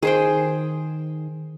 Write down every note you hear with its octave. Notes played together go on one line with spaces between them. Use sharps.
D#3 G#4 C5 G5